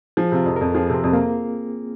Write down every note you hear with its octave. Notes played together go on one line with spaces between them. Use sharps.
F3 G#4
C3 F4
F2
F2 A#4
F3 G#4
C3 C4
F2
A#3